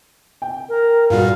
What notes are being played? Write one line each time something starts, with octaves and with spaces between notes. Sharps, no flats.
G5
A#4
G2 A#2 G3 F4 F#4 G#4 F5